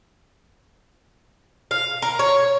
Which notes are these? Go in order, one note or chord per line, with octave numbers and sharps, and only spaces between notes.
F5
A#4
C#5